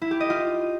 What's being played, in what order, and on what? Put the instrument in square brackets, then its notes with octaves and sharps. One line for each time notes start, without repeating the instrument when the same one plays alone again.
[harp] E4
G4
D#5
F4